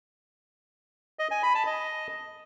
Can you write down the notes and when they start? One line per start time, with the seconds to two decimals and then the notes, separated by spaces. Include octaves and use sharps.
1.19 D#5
1.31 G#5
1.43 B5
1.55 A5
1.67 D#5